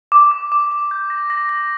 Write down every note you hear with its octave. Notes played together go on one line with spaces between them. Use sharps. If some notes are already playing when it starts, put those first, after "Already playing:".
D6
D6
D6
D6
G6
A#6
A#6
A#6